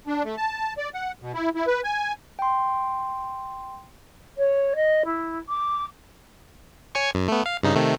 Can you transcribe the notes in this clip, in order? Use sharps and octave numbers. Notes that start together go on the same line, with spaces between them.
D4
A3
A5
D5
F#5
B2
E4
E4
B4
G#5
G5 C6
C#5
D#5
E4
D6
C#5 G#5 C#6
F#2
A3 B3
F5
G2 C#3 D#4
C3 D#3 A3